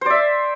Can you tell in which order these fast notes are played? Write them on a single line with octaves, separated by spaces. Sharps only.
C5 D5 E5